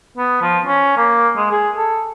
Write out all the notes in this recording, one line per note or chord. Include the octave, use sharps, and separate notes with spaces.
B3
F3
C#4
A#3
G#3
G#4
A4